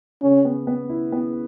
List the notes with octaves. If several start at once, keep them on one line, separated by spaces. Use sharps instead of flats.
C#3 C#4
B3
B3
E4
B3